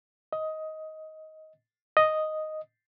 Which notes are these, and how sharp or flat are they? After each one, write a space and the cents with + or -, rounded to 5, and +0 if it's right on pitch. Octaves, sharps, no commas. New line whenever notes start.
D#5 +15
D#5 +0